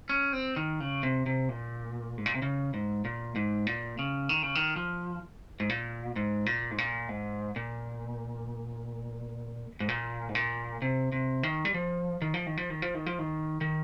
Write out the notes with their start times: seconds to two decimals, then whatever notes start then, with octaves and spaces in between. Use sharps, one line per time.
0.09 C#4
0.33 C4
0.56 D#3
0.80 C#3
1.03 C3
1.26 C3
1.49 A#2
2.18 G#2
2.26 A#2
2.35 C3
2.42 C#3
2.74 G#2
3.05 A#2
3.36 G#2
3.67 A#2
3.99 C#3
4.29 D#3
4.43 C#3
4.55 D#3
4.76 F3
5.60 G#2
5.69 A#2
6.16 G#2
6.46 A#2
6.71 G#2
6.78 A#2
7.09 G#2
7.56 A#2
9.80 G#2
9.88 A#2
10.29 G#2
10.35 A#2
10.82 C3
11.12 C3
11.43 D#3
11.65 G3
11.74 F3
12.22 D#3
12.34 F3
12.46 D#3
12.57 F3
12.70 D#3
12.82 F3
12.95 D#3
13.06 F3
13.19 D#3
13.61 D#3